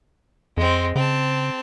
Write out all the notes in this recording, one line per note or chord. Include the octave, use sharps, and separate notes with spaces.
F2 G#3 C4
C#3 C4 A5